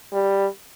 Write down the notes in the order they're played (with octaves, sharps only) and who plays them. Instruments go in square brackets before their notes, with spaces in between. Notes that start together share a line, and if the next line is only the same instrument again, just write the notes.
[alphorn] G3